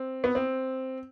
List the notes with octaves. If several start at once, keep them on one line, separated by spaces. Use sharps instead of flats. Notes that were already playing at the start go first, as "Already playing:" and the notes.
Already playing: C4
B3
C4